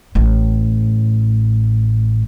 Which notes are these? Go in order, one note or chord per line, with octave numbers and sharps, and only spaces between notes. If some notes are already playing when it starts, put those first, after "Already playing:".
A1 A2